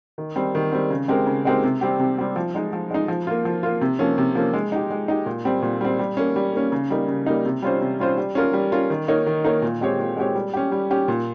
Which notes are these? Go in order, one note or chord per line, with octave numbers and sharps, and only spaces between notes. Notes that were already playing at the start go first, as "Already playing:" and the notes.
D#3
G3 C4
D#3
G3 C4
C#3
G#3 C4 G4 A#4
C#3
G#3 C4 G4 A#4
C3
G3 C4 G4
C3
G3 C4 G4
F3
G#3 D#4
F3
G#3 D#4
F3
A#3 F4
F3
A#3 F4
C3
F3 A#3 C#4
C3
F3 A#3 C#4
G#3
D#4 G4
G#3
D#4 G4
A#2
G3 C4
A#2
G3 C4
G3
A#3 C#4
G3
A#3 C#4
C#3
G3 A#3 D#4
C#3
G3 A#3 D#4
C3
G3 C#4 F4 C5
C3
G3 C#4 F4 C5
G3
C#4 F4 A#4
G3
C#4 F4 A#4
D#3
A#3 D#4 A#4 C#5
D#3
A#3 D#4 A#4 C#5
A#2
G#3 C4 G4 C#5
A#2
G#3 C4 G4 C#5
G3
C#4 G4
G3
C#4 G4
A#2